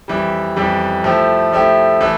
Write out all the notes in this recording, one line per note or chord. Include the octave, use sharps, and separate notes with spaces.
F2 E3 G3
F2 E3 G3
F3 A3 E4 G4
F3 A3 E4 G4
E3 A3